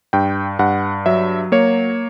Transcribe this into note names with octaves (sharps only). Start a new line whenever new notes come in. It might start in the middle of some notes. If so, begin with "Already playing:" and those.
G2 G5
G2 F#5
F#3 E5
A#3 C#5